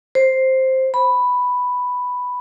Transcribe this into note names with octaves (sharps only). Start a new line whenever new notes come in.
C5
B5